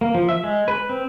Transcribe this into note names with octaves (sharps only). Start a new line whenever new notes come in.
A#3
F3
E5
G#3
B4
C4